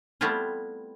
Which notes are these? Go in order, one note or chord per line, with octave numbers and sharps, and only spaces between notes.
G3 A3 B3 C4 E4 F4